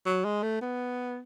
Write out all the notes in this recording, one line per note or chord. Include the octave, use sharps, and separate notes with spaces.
F#3
G#3
A3
B3